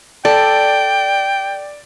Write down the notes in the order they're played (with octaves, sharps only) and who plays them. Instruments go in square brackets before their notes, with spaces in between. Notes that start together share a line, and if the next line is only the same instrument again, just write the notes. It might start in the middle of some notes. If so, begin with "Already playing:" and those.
[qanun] A4 [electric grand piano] D5 [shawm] G5